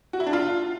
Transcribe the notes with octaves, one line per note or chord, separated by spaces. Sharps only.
F#4
E4
D4
F4